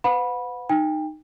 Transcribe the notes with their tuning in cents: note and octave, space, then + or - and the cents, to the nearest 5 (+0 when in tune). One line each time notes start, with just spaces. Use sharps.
B4 +35 F#5 -35 B5 -15
D#4 -15 G5 +25